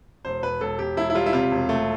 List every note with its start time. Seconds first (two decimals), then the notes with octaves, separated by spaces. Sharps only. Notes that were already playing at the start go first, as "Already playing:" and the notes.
0.25 E1 C5
0.43 E1 B4
0.61 E1 A4
0.79 E1 G4
0.97 E1 E4
1.10 E4
1.15 G3 F4
1.26 E4
1.33 C3 F4
1.51 E1
1.69 A3